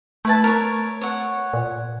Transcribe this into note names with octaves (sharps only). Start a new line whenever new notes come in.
A3 E4 B4 A5
A#4 C#5
C#5 F#5
A#2